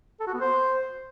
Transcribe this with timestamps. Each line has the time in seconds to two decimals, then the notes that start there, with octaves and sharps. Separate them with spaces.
0.20 A4
0.27 F#4
0.34 B3
0.41 C5